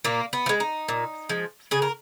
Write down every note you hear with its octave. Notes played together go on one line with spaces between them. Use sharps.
A#2 A#3
B3
F3
G#3
D#4
A#2
F3 G#3
C#3 G#4
A#4